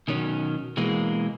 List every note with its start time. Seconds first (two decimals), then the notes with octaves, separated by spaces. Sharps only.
0.08 B2 D#3 F#3 C#4
0.77 B2 E3 G#3 A#3